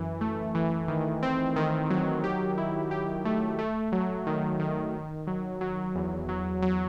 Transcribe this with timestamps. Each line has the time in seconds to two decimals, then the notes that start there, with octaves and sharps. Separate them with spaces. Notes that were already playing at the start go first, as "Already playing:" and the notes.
Already playing: F#2 E3
0.21 A3
0.55 E3
0.88 D#3
1.23 C4
1.56 D#3
1.90 F#3
2.24 G4
2.58 E4
2.91 G4
3.25 A3
3.59 A3
3.92 F#3
4.27 D#3
4.59 D#3
4.94 D#3
5.27 F#3
5.61 F#3
5.95 E2
6.29 F#3
6.62 F#3